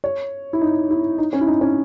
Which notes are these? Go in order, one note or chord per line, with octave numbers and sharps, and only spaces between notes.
C#5
E4
D#4
E4
D#4
C#4
E4
D#4
C#4